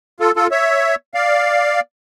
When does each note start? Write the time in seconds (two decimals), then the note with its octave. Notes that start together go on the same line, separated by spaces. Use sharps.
0.20 F4 A4
0.36 F4 A4
0.51 C#5 E5
1.14 D5 F5